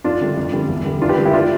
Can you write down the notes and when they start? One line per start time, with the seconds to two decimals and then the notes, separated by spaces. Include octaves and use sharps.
0.04 F2 D4 F4
0.21 D3 G3
0.37 F2
0.53 D3 G3
0.69 E2
0.85 D3 G3
1.01 F2 D4 F4
1.09 G4 B4
1.17 D3 G3
1.25 E4 G4
1.33 D4 F4